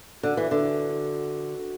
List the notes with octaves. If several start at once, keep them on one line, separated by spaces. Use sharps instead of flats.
D3 F#4
E3
D3